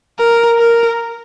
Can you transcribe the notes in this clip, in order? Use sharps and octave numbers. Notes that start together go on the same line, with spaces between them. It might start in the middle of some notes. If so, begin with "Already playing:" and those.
A#4
A#4